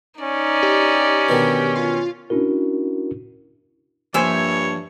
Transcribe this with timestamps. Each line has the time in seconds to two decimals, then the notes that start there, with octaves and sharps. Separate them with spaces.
0.20 C#4 D#4 D5
0.63 G4
1.29 B2 D3 D#3
1.76 F4
2.30 C#4 D4 E4 F#4 A#4
4.14 G2 F3 A#3 C5 C#5 E5 G#5